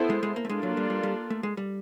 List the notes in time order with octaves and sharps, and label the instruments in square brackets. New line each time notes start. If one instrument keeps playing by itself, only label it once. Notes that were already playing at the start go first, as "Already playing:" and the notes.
Already playing: [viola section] B3 E4 A4 C5
[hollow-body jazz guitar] G#3
G#3
A#3
A3
[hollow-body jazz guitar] G#3 [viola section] A#3 D4 F4 A4
[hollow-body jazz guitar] F#3
G3
G3
G3
A3
G#3
G3